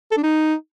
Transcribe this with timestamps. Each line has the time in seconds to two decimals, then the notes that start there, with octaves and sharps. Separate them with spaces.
0.11 A4
0.17 D4
0.23 D#4